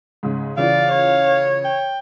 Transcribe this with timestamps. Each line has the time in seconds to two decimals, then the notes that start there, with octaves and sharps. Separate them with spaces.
0.23 G#2 C#3
0.57 C#3 E3 F4 D5 F5
0.93 C#5
1.64 G5